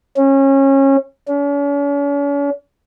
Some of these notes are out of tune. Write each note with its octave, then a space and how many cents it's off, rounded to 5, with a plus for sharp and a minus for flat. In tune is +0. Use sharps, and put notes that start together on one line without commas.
C#4 -25
C#4 +45